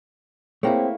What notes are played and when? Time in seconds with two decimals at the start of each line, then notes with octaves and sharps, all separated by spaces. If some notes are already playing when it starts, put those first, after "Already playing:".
0.63 A3 A#3 C4 E4 G#4 C#5 G5